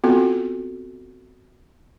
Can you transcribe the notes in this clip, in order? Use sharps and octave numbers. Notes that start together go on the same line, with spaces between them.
B3 C4 F4 F#4 A4